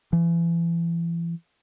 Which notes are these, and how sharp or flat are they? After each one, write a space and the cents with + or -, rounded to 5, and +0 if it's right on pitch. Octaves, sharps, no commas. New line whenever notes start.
E3 +35